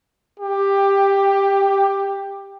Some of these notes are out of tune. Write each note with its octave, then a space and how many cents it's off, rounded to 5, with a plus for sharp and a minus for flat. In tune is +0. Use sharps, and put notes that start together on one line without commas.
G4 +10